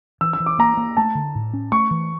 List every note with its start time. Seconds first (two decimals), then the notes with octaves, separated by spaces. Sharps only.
0.21 E3 E6
0.33 E6
0.40 E3
0.46 D6
0.59 A#3 A#5
0.77 A#3
0.97 A3 A5
1.15 D3
1.35 A2
1.54 C#4
1.72 A3 C#6
1.91 E3